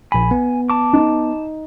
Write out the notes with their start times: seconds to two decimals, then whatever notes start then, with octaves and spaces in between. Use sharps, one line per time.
0.12 A#1 G#5 B5
0.31 B3
0.70 A5 D6
0.93 D#4